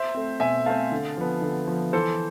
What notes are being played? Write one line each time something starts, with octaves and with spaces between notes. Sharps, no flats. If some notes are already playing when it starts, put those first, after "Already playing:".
Already playing: C5 E5
A3 C4
B2 E5 G#5
A3 C4 F5 A5
D3
F3 B3
D3
F3 B3
E3 A4 C5